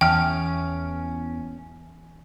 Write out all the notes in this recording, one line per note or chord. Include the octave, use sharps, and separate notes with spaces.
E2 E3 C#4 E5 G5 A5 F6